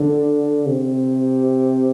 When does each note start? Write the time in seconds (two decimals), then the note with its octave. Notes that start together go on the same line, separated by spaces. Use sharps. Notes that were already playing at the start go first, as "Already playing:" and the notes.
Already playing: D3
0.67 C3